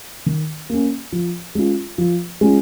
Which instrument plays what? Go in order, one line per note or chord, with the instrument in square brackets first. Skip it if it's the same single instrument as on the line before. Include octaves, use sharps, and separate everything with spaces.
[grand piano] D#3
A#3 C#4
F3
G#3 C#4 F4
F3
G#3 C#4 F4